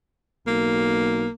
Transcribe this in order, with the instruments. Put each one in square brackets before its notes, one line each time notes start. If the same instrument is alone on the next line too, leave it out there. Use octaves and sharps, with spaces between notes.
[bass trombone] B1 [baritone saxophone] A#3